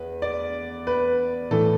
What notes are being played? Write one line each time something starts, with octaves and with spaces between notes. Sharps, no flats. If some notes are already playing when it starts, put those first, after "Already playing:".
Already playing: E2 B4
D5
B4
A2 E3 A4